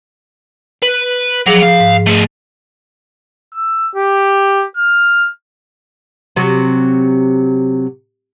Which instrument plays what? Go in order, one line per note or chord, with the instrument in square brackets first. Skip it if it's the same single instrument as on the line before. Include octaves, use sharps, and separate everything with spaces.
[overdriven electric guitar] B4
[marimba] F3 G#4 D6 [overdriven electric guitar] F#3
[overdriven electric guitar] F5
[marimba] G#2
[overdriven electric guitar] A3 G#4
[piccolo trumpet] E6
G4
F6
[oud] C3 F#3